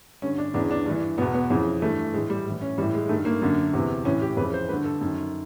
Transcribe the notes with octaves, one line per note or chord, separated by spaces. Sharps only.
G2 D3 C#4
D4
E2 C#3 E3 D4
D4
G2 E3 D4
E2 B2 B3
B3
F2 C#3 E3
G2 E3 A3
A2 E3 G#3
G3
A2 E3
C#4
A2 E3 G3
G#3
G2 D#3 A3
A#3
F#2 D3
E2 C3 E3
A2 E3 C#4
G4
F2 C#3 E3 B4
C5
G2 D3 B4
A4
F#2 D#3